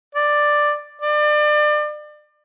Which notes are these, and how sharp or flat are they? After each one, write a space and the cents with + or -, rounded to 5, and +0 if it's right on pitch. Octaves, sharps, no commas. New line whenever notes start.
D5 +5
D5 +30